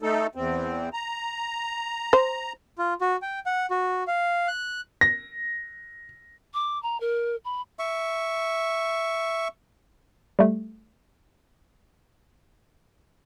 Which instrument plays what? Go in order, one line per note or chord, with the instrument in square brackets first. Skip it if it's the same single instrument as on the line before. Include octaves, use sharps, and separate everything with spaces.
[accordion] A3 D#4 A4
E2 C4
A#5
[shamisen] C5
[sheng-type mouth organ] F4
F#4
G5
F#5
F#4
F5
F#6
[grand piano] A#6
[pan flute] D6
A#5
A#4
B5
[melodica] E5 C#6
[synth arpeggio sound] G3 A3